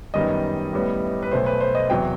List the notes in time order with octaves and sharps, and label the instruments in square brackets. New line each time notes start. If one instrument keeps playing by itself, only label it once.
[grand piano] F#2 D#3 G3 B3 D#5
A1 A2 G3 B3
B4
B1 B2 A3 C5
B4
C5
D#5
E2 C3 F#3 B3 G5